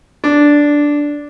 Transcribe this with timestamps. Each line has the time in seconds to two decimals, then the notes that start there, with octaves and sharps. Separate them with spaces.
0.24 D4